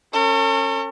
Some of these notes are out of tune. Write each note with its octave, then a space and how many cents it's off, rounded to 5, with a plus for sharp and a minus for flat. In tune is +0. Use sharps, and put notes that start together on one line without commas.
C#4 -20 A4 +45